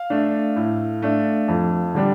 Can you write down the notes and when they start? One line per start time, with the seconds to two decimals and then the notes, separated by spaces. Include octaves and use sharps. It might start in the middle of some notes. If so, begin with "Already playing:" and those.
Already playing: F5
0.10 A3 D4
0.56 A2
1.02 A3 D4
1.48 F2
1.95 D3 G3 D4